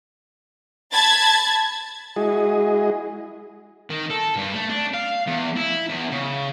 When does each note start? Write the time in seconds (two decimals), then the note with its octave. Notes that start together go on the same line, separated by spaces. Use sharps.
0.93 A5 B5 G#6 A6
2.16 G#3 E4 F#4 G#4 D#5
3.90 D#3
4.10 A4
4.36 G2
4.54 A3
4.70 D4
4.94 F5
5.27 E2
5.57 E4
5.89 E2
6.12 C#3